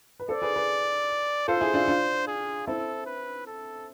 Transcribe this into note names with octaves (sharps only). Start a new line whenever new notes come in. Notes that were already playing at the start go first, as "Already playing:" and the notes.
B4
A4 C5 D5
G#4 B4
G#4 B4
F4 A4 C5
E4 G#4
D4 F4
D4 F4
G#4
C4 E4 A4
B4
A4